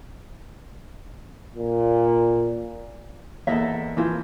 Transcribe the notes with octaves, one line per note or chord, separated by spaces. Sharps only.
A#2
E2 A#3 E4 A4 D#5 E5
E3 F3 A#3 C4 E4 F4